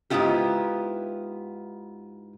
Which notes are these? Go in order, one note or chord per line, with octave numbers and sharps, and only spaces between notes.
G#2 B2 B3 E4 F4 G4